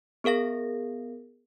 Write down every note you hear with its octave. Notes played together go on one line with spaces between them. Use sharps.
B3 G#4 A#4 F5 A#6